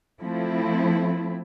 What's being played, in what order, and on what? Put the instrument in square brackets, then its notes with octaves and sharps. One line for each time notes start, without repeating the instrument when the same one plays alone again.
[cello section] F3 A3 C4 E4